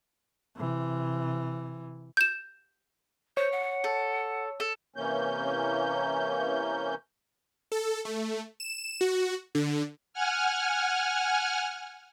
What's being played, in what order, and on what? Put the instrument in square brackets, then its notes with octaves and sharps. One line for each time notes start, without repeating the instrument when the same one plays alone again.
[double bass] C3 E3
[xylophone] G6 E7
[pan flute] C5 [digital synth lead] C#5
[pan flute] F#5
[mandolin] A4
A4
[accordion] C3 E3 A#3 C#4 G6
[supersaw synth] A4
A3
E7
F#4
D3
[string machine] F#5 G#5 F6